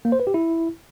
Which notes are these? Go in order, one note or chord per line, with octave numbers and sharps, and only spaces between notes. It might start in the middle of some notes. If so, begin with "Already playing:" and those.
A#3
C5
B4
G4
E4